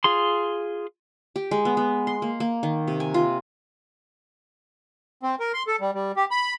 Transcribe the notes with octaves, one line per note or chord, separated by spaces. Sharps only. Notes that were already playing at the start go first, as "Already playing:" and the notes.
F4 G#4 C6
G4
G#3
B3
B3
C6
A#3
A#3
D#3
C3
G#5
F4
C4
A#4
C6
A4
G3
G3
G4
B5